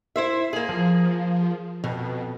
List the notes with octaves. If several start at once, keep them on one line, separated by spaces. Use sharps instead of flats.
E4 C5 E5
A#3 G#4
F3
F2 B2